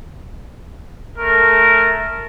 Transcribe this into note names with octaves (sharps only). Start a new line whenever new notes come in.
A3 A#4